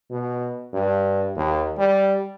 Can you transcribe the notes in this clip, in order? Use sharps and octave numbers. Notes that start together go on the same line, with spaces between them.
B2
G2
D#2
G3